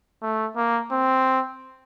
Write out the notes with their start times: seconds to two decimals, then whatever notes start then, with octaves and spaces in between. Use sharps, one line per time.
0.22 A3
0.56 A#3
0.92 C4